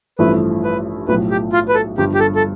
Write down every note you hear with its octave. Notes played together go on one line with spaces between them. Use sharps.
A1 G2 F3 A3 E4 B4
B4
B1 A2 F3 B4
G4
F4
B4
A4
G1 G2 F3 G4
G4
A4
A4